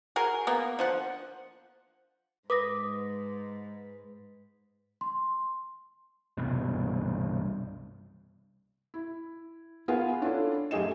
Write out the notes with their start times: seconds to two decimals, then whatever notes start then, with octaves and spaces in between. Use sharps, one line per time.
0.16 F#4 G#4 A#4
0.47 A#3 B3
0.79 D3 F3 F#5
2.50 G#2 B4 D6 D#6 A#6
5.01 C6
6.37 C2 G2 B2
8.94 E4
9.88 B3 F4 G#4 A#4 B4
10.21 C#4 D4 E4 F4 A4
10.71 F#2 A3 G4 G#4 D#5 E7